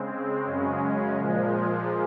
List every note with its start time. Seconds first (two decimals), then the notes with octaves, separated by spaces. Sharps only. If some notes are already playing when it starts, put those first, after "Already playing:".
Already playing: C#3 G#3 C4
0.46 F#2 C#3 G#3 C#4
1.18 A#2 F3 G#3